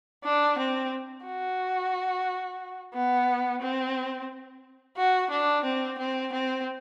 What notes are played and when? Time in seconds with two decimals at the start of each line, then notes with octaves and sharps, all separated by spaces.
0.24 D4
0.58 C4
1.26 F#4
2.94 B3
3.61 C4
4.97 F#4
5.30 D4
5.64 C4
5.98 C4
6.33 C4